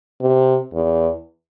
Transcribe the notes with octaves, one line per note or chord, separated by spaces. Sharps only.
C3
E2